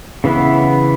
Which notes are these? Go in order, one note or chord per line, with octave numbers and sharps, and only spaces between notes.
C#3 E3 B3 E4